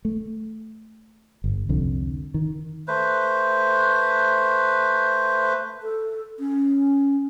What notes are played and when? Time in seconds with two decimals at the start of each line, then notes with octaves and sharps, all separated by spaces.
0.05 A3
1.44 G1
1.69 C2 F2 D3
2.34 D#3
2.88 A3 B4 C5
5.83 A4
6.39 C#4